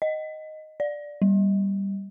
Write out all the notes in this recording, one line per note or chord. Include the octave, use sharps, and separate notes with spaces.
D#5
D5
G3